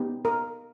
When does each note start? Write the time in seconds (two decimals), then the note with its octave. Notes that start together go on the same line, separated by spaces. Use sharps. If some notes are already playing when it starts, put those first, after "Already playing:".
Already playing: B3 D#4 G4
0.25 A#4